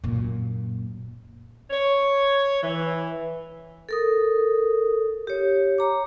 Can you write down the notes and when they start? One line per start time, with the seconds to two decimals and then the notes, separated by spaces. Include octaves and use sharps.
0.04 F#2 A#2
1.70 C#5
2.61 E3
3.89 A4 A#4 D#6
5.27 G4 C#5
5.78 C#5 A#5 D6